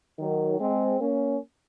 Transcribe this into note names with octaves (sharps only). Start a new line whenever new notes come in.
D#3 F#3
G#3 C4
A#3 C#4